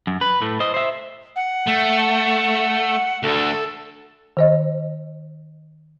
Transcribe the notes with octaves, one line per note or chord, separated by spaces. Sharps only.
F#2
B4
A2 A3
C5 D#5
C5 E5
F#5
A3
D2 D3 A4
D#3 C5 D#5